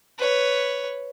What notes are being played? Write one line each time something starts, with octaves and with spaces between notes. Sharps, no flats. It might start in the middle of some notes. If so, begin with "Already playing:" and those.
B4 C#5